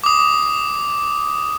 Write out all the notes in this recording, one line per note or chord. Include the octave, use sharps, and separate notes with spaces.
D6 D#6